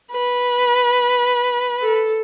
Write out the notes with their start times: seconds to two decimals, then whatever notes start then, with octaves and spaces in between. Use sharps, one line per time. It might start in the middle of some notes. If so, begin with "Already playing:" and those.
0.12 B4
1.82 A4